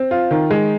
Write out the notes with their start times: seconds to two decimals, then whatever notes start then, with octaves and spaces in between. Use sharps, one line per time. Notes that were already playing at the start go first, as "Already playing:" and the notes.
Already playing: C4
0.11 F4
0.31 D#3
0.51 G#3